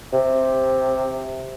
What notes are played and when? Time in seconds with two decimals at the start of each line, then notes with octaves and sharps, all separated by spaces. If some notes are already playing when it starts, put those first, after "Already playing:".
0.13 C3